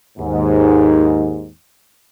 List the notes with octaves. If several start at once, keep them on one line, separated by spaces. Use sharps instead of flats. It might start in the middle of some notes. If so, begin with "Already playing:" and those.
D#2 G#2